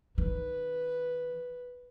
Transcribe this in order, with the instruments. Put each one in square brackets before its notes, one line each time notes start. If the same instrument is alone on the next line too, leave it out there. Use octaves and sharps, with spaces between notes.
[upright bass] D#3 [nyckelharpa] B4